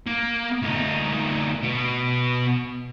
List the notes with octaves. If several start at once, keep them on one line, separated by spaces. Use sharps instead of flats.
A#3
D2 D#4
B2